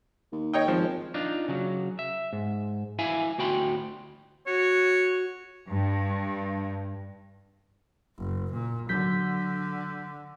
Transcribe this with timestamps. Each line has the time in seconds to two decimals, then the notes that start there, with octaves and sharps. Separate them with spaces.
0.32 D#2
0.53 C#5 D#5 G5
0.68 G#1 F3
1.14 D4 D#4 F4
1.48 C#3 F#3
1.99 E5
2.33 G#2
2.99 E4 E5 F5 G#5
3.38 D2 F#4 G5 B5 C6
4.47 F#4 C#5
5.67 G2
8.17 F#1
8.53 A#2
8.89 D3 F#3 G6 B6